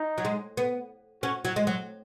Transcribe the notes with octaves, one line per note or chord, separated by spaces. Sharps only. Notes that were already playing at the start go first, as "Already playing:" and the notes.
Already playing: D#4
F#3
G#3
B3
C#4 F#4
F#3
G#3
F#3